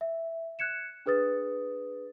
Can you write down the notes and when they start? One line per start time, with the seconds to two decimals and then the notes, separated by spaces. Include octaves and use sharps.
0.01 E5
0.59 F#6 G#6 C#7 E7
1.06 D4 G#4 B4 D#6 A6